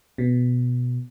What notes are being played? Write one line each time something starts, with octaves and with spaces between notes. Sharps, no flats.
B2